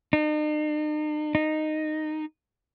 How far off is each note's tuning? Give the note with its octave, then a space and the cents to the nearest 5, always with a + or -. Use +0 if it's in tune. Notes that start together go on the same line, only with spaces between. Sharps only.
D#4 -45
D#4 -10